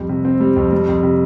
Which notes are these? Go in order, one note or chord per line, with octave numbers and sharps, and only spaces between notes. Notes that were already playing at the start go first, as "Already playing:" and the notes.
Already playing: F2 G3
C3
C4
G3
F2
G3
F2
C3